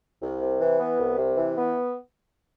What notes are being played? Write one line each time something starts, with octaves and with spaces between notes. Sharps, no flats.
C2
C3
E3
B3
C2
C3
E3
B3